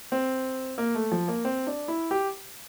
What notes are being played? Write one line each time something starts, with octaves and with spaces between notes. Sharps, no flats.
C4
A#3
A3
F3
A#3
C4
D4
E4
G4